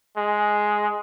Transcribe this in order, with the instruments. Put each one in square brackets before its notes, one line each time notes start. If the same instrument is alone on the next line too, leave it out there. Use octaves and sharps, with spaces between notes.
[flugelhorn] G#3